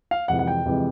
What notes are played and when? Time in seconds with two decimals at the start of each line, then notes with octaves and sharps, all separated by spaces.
0.11 F5
0.28 F2 C3 E3 G#3 F#5
0.39 F#5
0.48 G5
0.65 F2 C3 E3 G#3